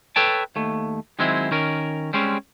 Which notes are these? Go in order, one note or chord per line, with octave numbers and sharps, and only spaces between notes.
A4 B4 C#5 G5 A5
D#2 A3
D#3 F#3 G#3 C4 E4
D#3 C#4 A#4
G3 G#3 C4 C#4